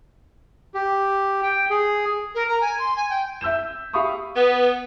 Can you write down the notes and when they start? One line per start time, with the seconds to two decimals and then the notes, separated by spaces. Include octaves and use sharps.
0.74 G4
1.43 G5
1.70 G#4
2.35 A#4
2.48 A#5
2.61 G#5
2.79 C6
2.96 G#5
3.10 G5
3.41 E5 E6 G6 E7
3.93 G4 E5 F5 B5 C#6 D#6
4.35 B3